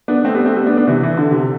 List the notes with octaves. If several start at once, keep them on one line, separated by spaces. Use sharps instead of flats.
B3 D4
A3 C4
G3 B3
A3 C4
G3 B3
B3 D4
B3 D4
C3 E3
E3
D3
C3